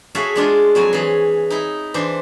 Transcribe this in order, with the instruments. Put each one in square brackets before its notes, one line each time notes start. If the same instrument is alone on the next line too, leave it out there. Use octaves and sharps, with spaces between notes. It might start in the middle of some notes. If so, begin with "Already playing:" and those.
[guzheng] F#4 G#4 A4 C#5 E5 F5
G#3 D4 F4
F2 F#3 C#5 G#5
E3 G#4
D#4 E4
E3 D4 C5